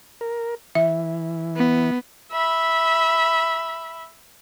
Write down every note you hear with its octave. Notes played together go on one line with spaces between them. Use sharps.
A#4
E3 E5
B3
E5 B5